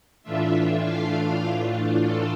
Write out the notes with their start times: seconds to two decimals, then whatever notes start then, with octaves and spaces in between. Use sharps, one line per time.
0.23 A2 E3 A3 D4 F4 E5
0.82 F5
2.00 A4